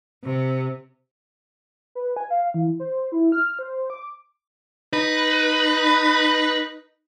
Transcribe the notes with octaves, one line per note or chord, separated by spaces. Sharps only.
C3
B4
G#5
F5
E3
C5
E4
F6
C5
D6
D#4 B4